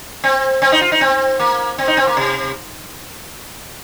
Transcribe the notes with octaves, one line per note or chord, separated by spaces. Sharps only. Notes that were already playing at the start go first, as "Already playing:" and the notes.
C4
C4
D#4
F4
D#4
C4
A#3
C4
D#4
C4
A#3
C3